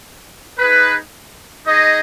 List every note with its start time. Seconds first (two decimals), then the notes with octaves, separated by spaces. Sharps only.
0.59 D#4 G#4 B4
1.65 D#4 G#4 D#5